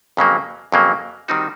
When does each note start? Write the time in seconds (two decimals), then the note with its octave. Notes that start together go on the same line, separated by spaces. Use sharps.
0.17 F2 C#3 F#3 A#3
0.72 F2 C#3 F#3 A#3
1.28 D#3 G3 C4 D#4 F#4